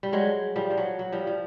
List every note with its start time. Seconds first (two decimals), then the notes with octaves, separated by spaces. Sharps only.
0.03 G3
0.13 F#3 G#3
0.56 F3 G3
0.70 F3
0.78 F#3
0.99 F#3
1.12 F3 G3
1.27 F3